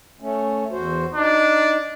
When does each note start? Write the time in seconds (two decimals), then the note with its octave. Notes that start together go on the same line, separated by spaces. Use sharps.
0.21 A3 C#4
0.71 E2 F#4 C5
1.14 D4 D#4